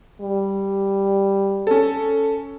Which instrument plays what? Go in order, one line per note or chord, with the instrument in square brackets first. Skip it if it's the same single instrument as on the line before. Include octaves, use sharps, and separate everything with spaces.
[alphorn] G3
[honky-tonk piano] C#4 A4